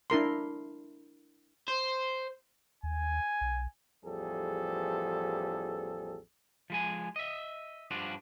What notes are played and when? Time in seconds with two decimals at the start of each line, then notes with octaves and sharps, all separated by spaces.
0.10 D4 E4 A#4 C6
1.68 C5
2.83 D#2 G#5
3.41 B1
4.04 A1 E2 F3 G3 G#4 A4
6.70 F3 G#3 G#5
7.16 D#5 E5
7.91 G2 F3 D4 F4 F#4